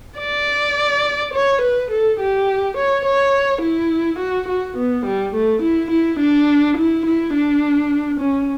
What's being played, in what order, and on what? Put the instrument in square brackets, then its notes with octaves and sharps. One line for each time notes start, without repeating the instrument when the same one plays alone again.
[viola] D5
C#5
B4
A4
G4
C#5
C#5
E4
F#4
F#4
B3
G3
A3
E4
E4
D4
E4
E4
D4
C#4